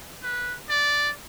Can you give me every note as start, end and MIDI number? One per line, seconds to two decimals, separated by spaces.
0.23 0.56 71
0.70 1.10 74